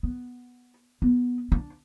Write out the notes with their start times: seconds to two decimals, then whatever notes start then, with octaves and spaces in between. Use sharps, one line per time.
0.03 B3
1.02 B3
1.52 D4